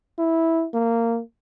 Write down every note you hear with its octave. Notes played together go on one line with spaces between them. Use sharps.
E4
A#3